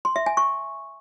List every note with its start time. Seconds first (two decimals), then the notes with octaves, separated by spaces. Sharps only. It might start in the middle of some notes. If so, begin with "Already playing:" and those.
0.05 C6
0.16 E5
0.26 G#5
0.37 C#6